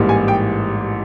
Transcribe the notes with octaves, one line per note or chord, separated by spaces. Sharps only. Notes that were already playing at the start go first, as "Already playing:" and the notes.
Already playing: A1 G#2 E3 G3 A#3
G#5
G5